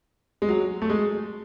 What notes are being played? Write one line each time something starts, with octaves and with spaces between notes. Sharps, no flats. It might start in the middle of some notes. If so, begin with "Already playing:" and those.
G#3
F#3
A3
G#3